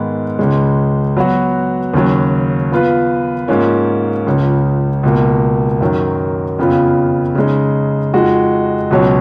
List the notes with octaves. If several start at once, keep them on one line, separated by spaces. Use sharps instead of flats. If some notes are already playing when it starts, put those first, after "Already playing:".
Already playing: G#2 D#3 G#3 B3
C#2 C#3 G#3
F#3 B3 F#4
D#2 C#3 F#3
F3 B3 F4 B4
G#2 F3 A#3 C#4
C#2 C#3 F3
C#2 B2 A#3
F#2 D#3 F#3
F2 C#3 F3 B3 F4
C#3 G#3 D#4
F2 F3 G#3 D#4 F#4
C#2 B2 F#3 C#4